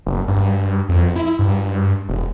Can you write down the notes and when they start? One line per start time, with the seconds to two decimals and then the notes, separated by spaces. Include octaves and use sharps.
0.06 F#1
0.28 G2
0.89 F2
1.16 E4
1.39 G2
2.09 E1